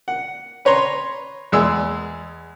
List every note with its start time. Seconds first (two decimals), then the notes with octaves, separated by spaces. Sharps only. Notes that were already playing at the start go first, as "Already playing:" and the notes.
0.08 F#5
0.65 B4 C#5 A#5 C6
1.52 E2 G#3 E6